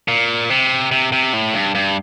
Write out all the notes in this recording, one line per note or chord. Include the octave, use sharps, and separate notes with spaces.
A#2
C3
C3
C3
A2
G2
G2